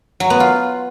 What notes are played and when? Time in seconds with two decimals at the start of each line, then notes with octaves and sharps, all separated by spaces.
0.20 F#3
0.30 B3
0.40 F4